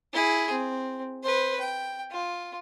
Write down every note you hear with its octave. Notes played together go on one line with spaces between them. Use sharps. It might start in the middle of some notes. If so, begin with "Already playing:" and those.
E4 G#4
C4
B4 C5
G5
F4